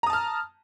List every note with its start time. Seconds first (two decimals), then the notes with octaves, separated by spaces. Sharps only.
0.03 A#5
0.06 D#6
0.10 A5
0.13 F6